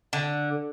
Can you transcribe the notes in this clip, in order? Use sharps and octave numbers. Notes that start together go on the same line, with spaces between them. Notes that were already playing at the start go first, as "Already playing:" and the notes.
D3